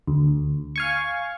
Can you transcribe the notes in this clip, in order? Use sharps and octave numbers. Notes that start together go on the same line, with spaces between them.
D2
F5 G#5 C#6